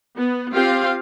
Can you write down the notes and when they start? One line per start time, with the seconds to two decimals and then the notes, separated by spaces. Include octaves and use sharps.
0.17 B3
0.54 C4 F4 G4 F5